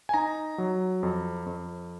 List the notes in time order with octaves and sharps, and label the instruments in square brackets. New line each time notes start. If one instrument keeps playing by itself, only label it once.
[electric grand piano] G#5
D#4 A#5
F#3
F2
F2